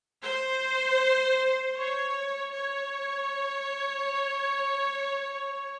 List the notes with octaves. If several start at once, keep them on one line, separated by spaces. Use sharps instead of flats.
C5
C#5
C#5